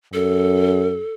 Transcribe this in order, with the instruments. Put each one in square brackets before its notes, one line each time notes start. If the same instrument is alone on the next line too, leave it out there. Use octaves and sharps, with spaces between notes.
[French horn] F#2 [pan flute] A4